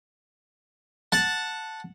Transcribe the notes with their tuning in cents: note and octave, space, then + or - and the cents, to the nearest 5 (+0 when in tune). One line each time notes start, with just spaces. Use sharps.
F#5 -10 A5 +0